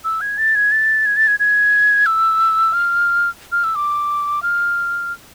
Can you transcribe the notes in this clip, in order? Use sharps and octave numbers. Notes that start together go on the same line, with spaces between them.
E6
G#6
A6
G#6
A6
G#6
A6
G#6
G#6
E6
F6
F6
E6
D6
F6